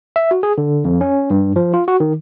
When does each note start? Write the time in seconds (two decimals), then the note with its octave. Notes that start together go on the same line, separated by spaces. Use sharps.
0.16 E5
0.31 F#4
0.43 G#4
0.58 D3
0.85 F2
1.01 C#4
1.30 G2
1.56 F3
1.74 F4
1.88 F#4
2.00 D#3